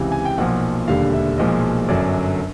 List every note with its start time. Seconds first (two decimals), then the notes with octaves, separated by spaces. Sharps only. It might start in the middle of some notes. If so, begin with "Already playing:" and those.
Already playing: C#2 C3 E3
0.12 G#5
0.25 G5
0.38 B1 A#2 F3 F#5
0.87 E1 D#2 D3 G3 F5
1.13 E5
1.38 B1 A#2 F3 G#3 D#5
1.88 G1 F#2 D3 F#3 D5